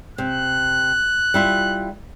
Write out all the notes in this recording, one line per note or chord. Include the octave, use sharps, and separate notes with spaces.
C3 F#6
G3 E4 F4